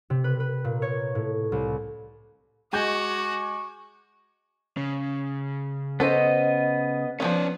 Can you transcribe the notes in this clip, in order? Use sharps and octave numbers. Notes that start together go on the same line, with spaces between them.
C3
B4
B4
A#2
C#5
A2
C2
G#3 F#4 G#5 C#6 D6 G6
C#3
B3 C#4 A4 C5 D#5
F3 F#3 B3 C#4 D5